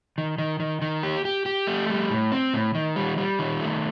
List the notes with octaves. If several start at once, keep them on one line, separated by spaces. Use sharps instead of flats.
D#3
D#3
D#3
D#3
G4
G4
G4
A3
G3
A2
C4
A2
D#3
G3
G3
D#3
A3